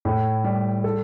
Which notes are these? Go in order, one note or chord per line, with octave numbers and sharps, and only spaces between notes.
A2
G3
A4